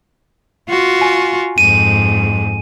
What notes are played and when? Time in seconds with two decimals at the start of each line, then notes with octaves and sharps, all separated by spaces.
0.69 F4 F#4
1.01 G#5
1.58 F2 G#2 D#7